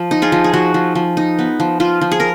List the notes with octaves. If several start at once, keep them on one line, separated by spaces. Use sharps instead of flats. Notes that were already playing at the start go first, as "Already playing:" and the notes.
Already playing: F3
D#4
F4 G#4
F3
G#4
F3 F#4
F3
F3
D#4
B3
F3
F3 F4
F3
G#4
A#4